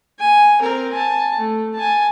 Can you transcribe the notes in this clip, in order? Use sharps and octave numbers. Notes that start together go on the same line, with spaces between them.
G#5
C4 A#4
G#5 A5
A3
G#5 A5